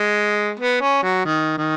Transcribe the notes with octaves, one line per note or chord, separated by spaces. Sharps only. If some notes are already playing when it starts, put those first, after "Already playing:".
Already playing: G#3
B3
C#4
F#3
D#3
D#3